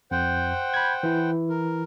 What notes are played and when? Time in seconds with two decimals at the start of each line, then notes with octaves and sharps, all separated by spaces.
0.11 F2 C5 F#5 G5
0.74 B5 G6 G#6
1.03 E3 E4
1.49 A#4